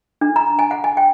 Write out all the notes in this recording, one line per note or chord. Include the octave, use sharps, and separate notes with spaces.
D4
A#5
G#5
F#5
G#5
G5